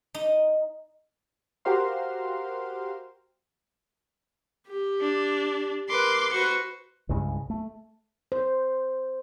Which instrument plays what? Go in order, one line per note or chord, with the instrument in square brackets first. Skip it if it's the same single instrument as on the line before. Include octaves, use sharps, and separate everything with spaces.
[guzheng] D#4
[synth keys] F#4 G4 A#4 C5 F5 C6
[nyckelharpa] G4
[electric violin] D4
[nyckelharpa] A#4 B4 [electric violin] C6 D6
[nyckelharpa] F#4 B4 [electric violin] C5 C#7
[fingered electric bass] C2 G2 C#3 G#3
A3
[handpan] C5